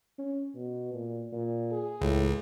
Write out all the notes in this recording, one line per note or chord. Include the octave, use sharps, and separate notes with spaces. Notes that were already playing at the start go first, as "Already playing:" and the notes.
C#4
B2
A#2
A#2
G#4
C#2 A2